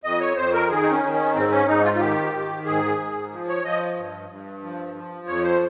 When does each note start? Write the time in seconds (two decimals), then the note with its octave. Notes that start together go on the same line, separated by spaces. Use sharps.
0.04 F2 D#5
0.20 C#5
0.37 F2 C5
0.54 A#4
0.70 D#3 G#4
0.82 D#4
0.91 C#4
1.03 D#3
1.13 C#4
1.35 G#2 C4
1.51 C#4
1.67 G#2 D#4
1.84 F4
1.94 F4
2.00 D#3 G4
2.33 D#3
2.66 G#2 G#4
2.98 G#2
3.32 F3
3.48 C#5
3.64 F3 D#5
3.96 G2
4.30 G2
4.63 F3
4.94 F3
5.27 F2 C#5
5.44 C5